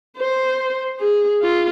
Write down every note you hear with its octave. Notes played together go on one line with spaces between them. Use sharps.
C5
G#4
F4